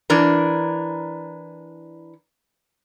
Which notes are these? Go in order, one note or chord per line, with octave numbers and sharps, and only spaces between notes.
E3 D4 A#4